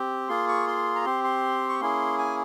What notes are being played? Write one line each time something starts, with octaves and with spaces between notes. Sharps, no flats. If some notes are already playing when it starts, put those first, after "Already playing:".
Already playing: C4 G4
A#3 F4 G#4 C6
C#6
C6
A#5
C4 G4 C6
C6
C#6
A#3 C#4 E4 G#4 C6
G#5